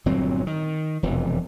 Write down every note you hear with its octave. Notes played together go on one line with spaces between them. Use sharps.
G1 A#2 F#3 C4
D#3
E1 F2 C3 E3